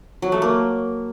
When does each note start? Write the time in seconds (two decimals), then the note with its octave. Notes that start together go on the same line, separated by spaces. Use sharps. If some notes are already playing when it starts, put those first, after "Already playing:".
0.22 F#3
0.32 A3
0.42 A#3